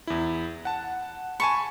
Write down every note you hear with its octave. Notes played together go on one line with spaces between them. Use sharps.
E2 E4
F#5 A5
G#5 A5 B5 C#6